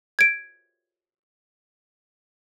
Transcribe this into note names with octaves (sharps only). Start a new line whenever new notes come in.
G#6 D7